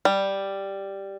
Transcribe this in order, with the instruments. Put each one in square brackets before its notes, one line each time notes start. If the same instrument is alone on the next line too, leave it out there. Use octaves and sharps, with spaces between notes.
[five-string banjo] G3